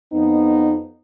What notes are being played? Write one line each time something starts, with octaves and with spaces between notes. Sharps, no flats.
F2 B3 D#4